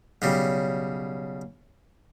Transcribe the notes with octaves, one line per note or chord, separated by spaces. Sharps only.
B1 C#3 G3